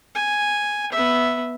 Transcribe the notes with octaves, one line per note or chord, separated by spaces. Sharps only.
G#5
B3 E5